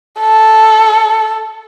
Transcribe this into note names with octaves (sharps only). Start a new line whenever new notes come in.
A4